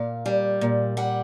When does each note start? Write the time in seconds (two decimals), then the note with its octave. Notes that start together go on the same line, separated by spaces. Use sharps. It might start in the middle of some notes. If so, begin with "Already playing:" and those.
Already playing: A#2 F5
0.26 G3
0.61 A#2
0.97 G3 F#5